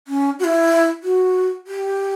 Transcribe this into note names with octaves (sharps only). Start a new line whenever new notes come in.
C#4
F#4
E4
F#4
G4